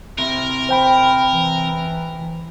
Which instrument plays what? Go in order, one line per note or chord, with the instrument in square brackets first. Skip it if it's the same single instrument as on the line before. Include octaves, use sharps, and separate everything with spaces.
[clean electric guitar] C3 E4 [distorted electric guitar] A#4
[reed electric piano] C5 G5 B5
[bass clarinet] E3